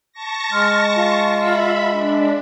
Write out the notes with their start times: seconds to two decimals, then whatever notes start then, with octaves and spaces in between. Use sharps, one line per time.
0.13 A5 C#6 A#6
0.51 G#3 C6 F6
0.96 F4
1.37 E5 B5
1.90 D4